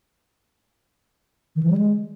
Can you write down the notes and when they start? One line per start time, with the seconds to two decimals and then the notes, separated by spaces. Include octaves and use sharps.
1.56 D#3
1.63 E3
1.70 G3
1.77 G#3